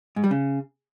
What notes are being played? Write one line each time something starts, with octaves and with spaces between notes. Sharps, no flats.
G#2
G3
C#3